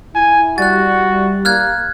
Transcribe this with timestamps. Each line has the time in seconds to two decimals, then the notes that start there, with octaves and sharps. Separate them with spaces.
0.15 E4 G#5
0.58 G3 F#4 F#6 A6
1.45 A#3 F6 F#6 G#6